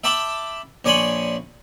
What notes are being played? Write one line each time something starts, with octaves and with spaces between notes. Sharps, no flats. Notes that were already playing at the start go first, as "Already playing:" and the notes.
E5 G5 A5 B5 D6
A#1 C#5 D5 G#5 B5 C6